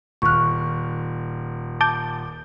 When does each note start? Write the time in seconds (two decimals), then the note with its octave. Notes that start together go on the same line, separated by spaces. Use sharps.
0.22 D#1 C#6 F6 F#6
1.81 A5 D6 G6